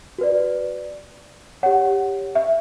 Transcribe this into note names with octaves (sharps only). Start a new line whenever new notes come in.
F#4 B4 D5
G4 C#5 F#5
E5